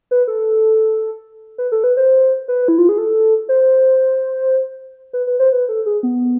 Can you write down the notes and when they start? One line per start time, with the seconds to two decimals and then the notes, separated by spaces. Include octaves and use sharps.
0.11 B4
0.28 A4
1.58 B4
1.72 A4
1.84 B4
1.97 C5
2.48 B4
2.68 E4
2.78 F4
2.89 G#4
2.98 A4
3.49 C5
5.13 B4
5.27 B4
5.39 C5
5.52 B4
5.69 A4
5.86 G#4
6.03 B3